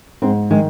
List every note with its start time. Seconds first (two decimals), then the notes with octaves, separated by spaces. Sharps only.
0.22 G#2 C4
0.51 D#3 G#3